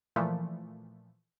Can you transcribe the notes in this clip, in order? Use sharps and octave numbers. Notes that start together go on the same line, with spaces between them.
A#2 E3 F3 A3